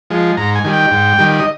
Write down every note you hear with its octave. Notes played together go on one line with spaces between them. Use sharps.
F3 G#3
G#2 A#5
G#5
D#3 G3
G5
G#2
D#3 G3
D#5